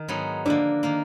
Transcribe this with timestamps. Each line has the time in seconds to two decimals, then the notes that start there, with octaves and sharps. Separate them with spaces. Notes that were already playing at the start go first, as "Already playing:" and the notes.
Already playing: D#3
0.08 G#2 F#3 B3 D#4
0.45 D3 F3 A#3 D4
0.83 D#3 A#3